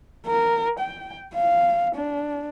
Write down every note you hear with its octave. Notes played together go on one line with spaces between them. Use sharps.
A#4
G5
F5
D4